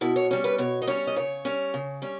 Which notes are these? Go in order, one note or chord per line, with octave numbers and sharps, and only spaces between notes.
B2 E4
C#5
G3 C#4
B4
B2 C#5
D#5
G3 C#4 C#5
D#5
C#3 C#5
G3 C#4
C#3
G3 C#4